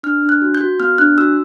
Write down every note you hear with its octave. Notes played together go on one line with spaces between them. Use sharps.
D4 F6
D4
F#6
F#4
G6
F#4
B3 F6
D4 F#6
F#4 E6